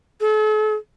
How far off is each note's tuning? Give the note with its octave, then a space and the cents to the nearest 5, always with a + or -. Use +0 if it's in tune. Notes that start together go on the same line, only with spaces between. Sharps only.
A4 -40